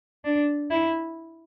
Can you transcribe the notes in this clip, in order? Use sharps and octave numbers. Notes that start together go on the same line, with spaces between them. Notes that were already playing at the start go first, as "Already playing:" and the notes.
D4
E4